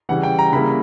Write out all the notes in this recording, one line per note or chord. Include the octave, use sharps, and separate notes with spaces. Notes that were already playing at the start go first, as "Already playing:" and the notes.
C#3 E3 G3 F#5
G5
A#5
C#3 G3 A#3 E4 B5